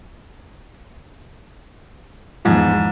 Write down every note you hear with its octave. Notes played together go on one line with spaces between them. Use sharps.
E2 G#2 F3